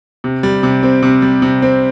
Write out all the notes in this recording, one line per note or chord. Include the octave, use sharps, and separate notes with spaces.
C3
G3
C3
C4
C3
G3
C3
C4